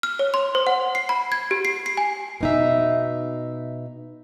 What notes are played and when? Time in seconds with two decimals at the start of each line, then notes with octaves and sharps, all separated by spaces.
0.03 F6
0.19 C#5
0.34 C6
0.55 C5
0.67 F#5
0.95 C7
1.09 B5
1.32 G#6
1.51 G4
1.65 C7
1.86 C7
1.97 G#5
2.41 B2 D#4 E5